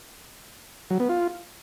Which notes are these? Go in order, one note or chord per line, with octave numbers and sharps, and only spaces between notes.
F#3
B3
F4